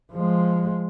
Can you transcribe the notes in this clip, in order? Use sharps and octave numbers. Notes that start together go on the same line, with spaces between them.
F3 G#3